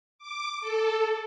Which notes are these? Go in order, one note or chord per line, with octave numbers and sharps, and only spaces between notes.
D6
A4